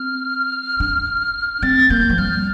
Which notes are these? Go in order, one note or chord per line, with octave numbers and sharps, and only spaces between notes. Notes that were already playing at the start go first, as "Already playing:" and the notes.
Already playing: C4 F6
D4
C4 A6
A#3 G6
D#3
F3
G3 F6